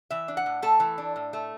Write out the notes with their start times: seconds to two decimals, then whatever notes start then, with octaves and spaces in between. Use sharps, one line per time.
0.10 E3 E5
0.28 D4
0.37 F#5
0.46 A2
0.62 A3 A4
0.80 E3
0.98 D4
1.16 A2
1.33 A3